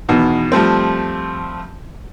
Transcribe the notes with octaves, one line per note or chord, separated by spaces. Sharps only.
E2 B2 D#3
F3 G3 A3 C4